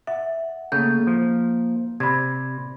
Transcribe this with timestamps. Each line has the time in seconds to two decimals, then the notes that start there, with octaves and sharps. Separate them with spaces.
0.07 E5 F#5
0.72 C#3 A3 A#3 G6
1.07 F3
2.00 C3 D5 B5 G#6